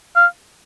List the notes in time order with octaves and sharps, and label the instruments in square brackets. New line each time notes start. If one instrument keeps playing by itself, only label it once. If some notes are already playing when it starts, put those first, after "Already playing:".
[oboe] F5